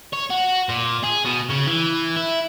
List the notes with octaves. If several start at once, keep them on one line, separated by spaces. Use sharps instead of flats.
C#5
F#4
A#2
G#4
B2
C#3
E3
E4